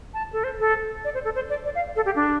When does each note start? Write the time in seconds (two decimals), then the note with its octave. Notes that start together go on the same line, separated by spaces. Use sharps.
0.14 A5
0.33 A4
0.44 C5
0.59 A4
1.04 D5
1.14 C5
1.25 A4
1.35 C5
1.49 D5
1.65 D5
1.75 F5
1.96 A4
2.06 G4
2.16 D4